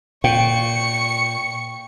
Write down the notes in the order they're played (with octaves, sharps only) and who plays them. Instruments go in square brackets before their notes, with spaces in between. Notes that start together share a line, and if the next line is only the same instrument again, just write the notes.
[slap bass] A#2 [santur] G5 [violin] C#6 C#7